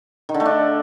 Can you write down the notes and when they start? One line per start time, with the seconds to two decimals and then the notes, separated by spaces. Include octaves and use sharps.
0.29 D#3
0.34 D3
0.40 A3
0.46 D4